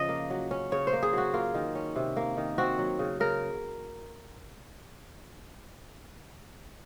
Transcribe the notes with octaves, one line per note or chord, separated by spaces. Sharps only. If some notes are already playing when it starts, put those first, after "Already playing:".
Already playing: C#3 F3 D#5
A#3
F#3
C#4
C#3 C#5
C5
A#3
G#4
F#3 F#4
A#3 F4
D#3
C#4
C3
A#3
D#3
C4 F#4
F#3
C#3
C#3 A#4